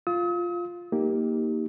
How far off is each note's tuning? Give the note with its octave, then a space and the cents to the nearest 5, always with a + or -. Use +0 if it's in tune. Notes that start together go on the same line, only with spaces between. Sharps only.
F4 +0 D#6 +45
A#3 +0 D#4 +15 G4 +0